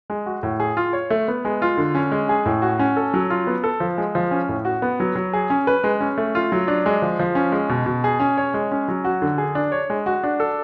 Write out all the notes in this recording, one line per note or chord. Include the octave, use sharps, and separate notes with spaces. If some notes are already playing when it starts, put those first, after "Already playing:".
G#3
F#4
A2
G#4
F4
C#5
A3
B3
G#3
F4
D3
C#4
G#3
G#4
A2
F#4
C#4
A4
F#3
F4
B3
A4
F3
G#3
F3
C#4
A2
F#4
B3
F#3
F#3
G#4
C#4
B4
G#3
C#4
A3
F4
F#3
D4
G#3
F3
F3
C#4
G#3
B2
B2
G#4
C#4
C#5
G#3
C#4
F#3
F#4
D3
G#4
D4
C#5
G#3
F#4
D4
A4